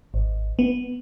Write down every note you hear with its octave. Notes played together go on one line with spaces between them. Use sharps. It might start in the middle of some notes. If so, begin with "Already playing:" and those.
G#1
B3